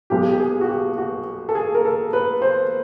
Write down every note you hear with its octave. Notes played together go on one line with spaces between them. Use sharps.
B1 B2 G#3 G4
G4
G#4
F#4
G4
F#4
A4
G#4
A#4
A4
B4
C5